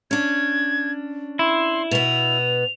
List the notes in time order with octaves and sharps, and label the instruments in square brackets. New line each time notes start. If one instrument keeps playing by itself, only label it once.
[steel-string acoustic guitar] C#4 D4 [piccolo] G#6
[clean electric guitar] E4 [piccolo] C6
[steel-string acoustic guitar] B2 B3 [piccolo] F7